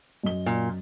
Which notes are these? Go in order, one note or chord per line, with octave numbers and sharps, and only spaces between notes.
F#2 D#5 G7
A#2